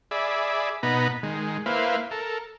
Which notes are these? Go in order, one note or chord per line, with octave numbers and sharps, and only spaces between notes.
G#4 D5 E5 B5
B2 B3 D#4 A#5 B5
D#3 G#3
A#3 E4 B4 C5 F5
A4 A#4